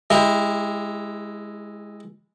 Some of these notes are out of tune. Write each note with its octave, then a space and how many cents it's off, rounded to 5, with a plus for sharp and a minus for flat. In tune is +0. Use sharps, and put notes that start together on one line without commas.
G#3 +0 E4 +0 G4 +35